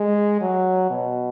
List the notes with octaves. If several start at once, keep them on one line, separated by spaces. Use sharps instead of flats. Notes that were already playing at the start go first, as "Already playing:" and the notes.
Already playing: G#3
F#3
B2